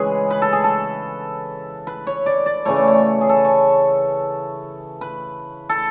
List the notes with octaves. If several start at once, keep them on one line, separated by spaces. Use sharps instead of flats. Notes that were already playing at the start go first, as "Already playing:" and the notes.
Already playing: C#3 E3 G#3 G#4 B4 C#5
B4
A4
G#4
A4
B4
C#5
D5
D5
C#3 E3 A3 C#5
D5
C#5
G#4
A4
B4
C#5
B4
A4